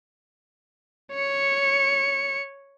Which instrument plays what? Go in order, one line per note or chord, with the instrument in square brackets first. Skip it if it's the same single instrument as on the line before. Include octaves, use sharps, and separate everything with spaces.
[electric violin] C#5 C#7